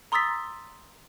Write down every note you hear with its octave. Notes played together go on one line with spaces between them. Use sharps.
A#5 C6 D#6 E6 A6 B6